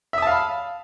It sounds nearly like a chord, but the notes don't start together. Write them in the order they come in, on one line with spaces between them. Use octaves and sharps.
E5 D#6 A5 F5 B5